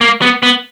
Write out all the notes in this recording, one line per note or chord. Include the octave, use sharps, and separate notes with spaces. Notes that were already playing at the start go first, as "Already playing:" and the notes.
A#3
B3
B3